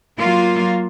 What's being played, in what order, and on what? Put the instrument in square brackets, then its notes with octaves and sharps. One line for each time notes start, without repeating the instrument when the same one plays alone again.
[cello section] F#3 A#3 F4